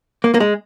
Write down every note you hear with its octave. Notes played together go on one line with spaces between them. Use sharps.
A#3
A#3
G#3